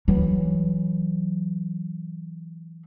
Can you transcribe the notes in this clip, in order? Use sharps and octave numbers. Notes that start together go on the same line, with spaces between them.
E3 F#3